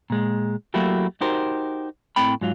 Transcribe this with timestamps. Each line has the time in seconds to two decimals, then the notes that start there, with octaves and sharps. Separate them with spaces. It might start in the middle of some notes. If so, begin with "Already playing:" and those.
0.10 A#2 G#3
0.74 F#3 A3 A#3 E4 F#4 G4
1.21 D#4 F#4 G4 A#4 C5
2.16 A2 C4 G5 B5
2.41 G#2 F#3 F4